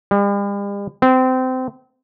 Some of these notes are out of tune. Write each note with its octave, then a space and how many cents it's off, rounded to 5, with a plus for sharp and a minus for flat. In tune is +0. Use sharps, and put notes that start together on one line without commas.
G3 +45
C4 -25